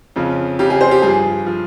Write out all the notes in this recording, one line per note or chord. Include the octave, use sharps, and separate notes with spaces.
F2 C#3 F3
F2 C#3 F3 G4
G#4
C5
G4
G2 F3 G#4
F3